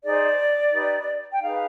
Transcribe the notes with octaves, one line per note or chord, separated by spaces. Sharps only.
D#4 G#4 C5 D5
D#4 G4 B4
G5
D#4 G#4 B4 F5